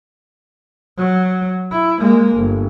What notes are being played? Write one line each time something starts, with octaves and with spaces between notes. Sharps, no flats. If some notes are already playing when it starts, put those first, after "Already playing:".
F#3
E4
G#3 A#3
G1